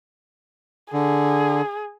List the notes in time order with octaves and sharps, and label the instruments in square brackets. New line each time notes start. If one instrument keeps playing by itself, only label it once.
[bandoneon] D3 [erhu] G#4